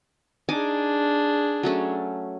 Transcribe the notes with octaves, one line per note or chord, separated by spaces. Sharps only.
D4 D#4 G#4 G#5 D6
F#3 A3 C#4